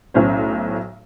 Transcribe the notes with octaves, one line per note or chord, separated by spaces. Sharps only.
B1 A2 C#4 C5